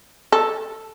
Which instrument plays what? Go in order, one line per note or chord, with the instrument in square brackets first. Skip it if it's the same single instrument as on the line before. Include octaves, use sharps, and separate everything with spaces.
[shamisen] A4